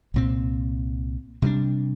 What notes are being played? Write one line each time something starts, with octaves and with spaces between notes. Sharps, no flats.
C2 A#2 G#3 C4
C3 G3 A#3 D4